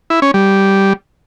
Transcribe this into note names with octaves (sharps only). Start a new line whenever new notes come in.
E4
C#4
G3